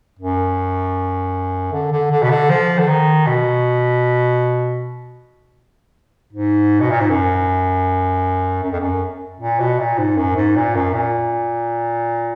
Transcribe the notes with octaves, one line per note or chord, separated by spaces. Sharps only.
F#2
D3
D3
D3
B2
D3
F3
D3
D#3
B2
G#2
B2
A#2
G#2
F#2
F#2
F2
F#2
A#2
B2
A#2
G#2
F#2
G#2
A#2
F#2
A#2